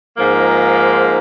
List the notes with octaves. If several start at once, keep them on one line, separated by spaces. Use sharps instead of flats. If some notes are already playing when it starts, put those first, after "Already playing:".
G#2 F3 A#3